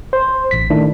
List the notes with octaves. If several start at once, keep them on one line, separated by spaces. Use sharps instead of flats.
C5
A1 B6
D#3 A3 D4 E4